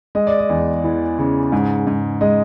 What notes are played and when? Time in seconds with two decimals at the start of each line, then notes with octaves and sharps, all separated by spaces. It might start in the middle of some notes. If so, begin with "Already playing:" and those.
0.15 G#3 D#5
0.27 D5
0.39 D#5
0.49 E2
0.84 E3
1.18 C#3
1.52 G#2
1.87 G#2
2.21 G#3 D#5